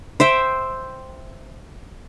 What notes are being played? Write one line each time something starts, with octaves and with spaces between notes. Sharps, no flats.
C5 E5 G5